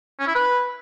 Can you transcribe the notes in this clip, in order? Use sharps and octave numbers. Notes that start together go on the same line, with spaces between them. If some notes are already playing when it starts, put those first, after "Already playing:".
C#4
E4
B4